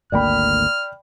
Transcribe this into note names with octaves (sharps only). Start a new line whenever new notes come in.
G#1 D2 A#3 D5 G5 B5 F6